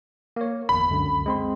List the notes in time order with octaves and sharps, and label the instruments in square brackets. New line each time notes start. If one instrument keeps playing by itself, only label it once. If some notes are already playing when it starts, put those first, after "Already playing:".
[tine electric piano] A#3 C#5
[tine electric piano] G1 E2 [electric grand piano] B5
[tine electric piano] C#2 F#2 D3
G#3 C4 C6